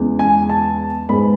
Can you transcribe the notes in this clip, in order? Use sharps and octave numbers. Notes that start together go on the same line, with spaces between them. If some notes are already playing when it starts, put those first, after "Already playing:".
Already playing: E2 C#3 G#3
G#5
A5
G#2 G#3 B3 B5